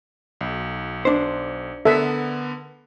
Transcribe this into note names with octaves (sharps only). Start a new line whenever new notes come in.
B1
D4 C5
D3 B3 A4 A#4 E5